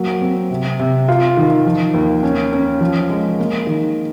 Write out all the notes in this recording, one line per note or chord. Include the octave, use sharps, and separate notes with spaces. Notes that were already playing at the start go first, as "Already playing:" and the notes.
Already playing: F#3 A#3
C4
C3
C3
F4
D#3
F3
D#2
C#4
C#4
F3
G#3
A#3
D#3